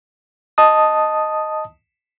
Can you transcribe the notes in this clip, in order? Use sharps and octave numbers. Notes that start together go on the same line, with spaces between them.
D#5 A5 D#6